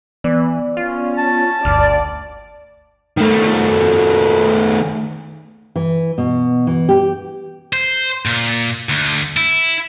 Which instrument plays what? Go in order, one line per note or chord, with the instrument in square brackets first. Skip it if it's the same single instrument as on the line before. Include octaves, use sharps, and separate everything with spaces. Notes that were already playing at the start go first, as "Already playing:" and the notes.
[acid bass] E3 [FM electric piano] B3 D5
[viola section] C#4 [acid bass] F4
[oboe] A5
[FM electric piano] G1 F6 [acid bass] D2 [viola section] D5
[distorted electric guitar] D#3 A3
[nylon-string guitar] E3
B2
E3
G4
[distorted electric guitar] C5
A#2
D2
E4